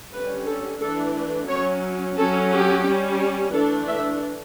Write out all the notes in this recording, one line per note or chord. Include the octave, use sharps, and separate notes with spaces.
D3 G3 C#4 B4
A4
E3 A3 D4 A4
F#3 C#4 C#5
F#3 C#4 A4
G4
G3 C#4
E3 A3 D4 A4
E5